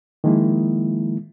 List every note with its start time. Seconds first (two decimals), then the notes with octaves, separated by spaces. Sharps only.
0.24 D#3 F3 G#3 A#3 E4